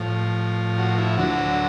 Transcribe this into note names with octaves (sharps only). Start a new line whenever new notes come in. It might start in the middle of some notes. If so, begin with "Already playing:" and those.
Already playing: A2 F3
F#4
E4
D2 D3 F#3 F#4